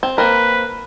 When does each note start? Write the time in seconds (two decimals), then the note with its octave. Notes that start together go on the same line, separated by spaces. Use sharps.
0.03 C4
0.18 A#3 C4 A#4 B4